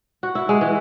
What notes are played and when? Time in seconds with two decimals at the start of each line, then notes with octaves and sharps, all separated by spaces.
0.23 F#4
0.35 E4
0.49 G#3
0.61 E3